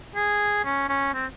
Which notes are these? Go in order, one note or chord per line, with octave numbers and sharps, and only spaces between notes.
G#4
C#4
C#4
C4